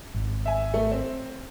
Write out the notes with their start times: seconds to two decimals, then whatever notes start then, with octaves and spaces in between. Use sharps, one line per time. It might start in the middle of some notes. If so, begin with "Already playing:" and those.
0.14 G#1
0.45 E5 G#5
0.74 A3
0.92 C4